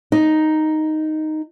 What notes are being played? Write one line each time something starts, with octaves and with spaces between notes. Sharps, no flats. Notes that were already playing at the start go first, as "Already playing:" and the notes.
D#4